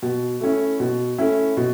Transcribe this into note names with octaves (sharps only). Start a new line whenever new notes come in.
B2
A3 C#4 E4
B2
A3 C#4 E4
B2